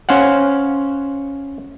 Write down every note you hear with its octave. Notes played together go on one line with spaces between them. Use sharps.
C#4 C5 F5 F#5